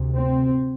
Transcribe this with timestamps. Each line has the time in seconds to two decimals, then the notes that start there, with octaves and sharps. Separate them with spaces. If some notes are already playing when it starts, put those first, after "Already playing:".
Already playing: D2 C3
0.17 C4